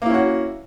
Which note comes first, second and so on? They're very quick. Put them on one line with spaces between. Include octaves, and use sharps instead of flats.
A#3 E4 C#4 F#4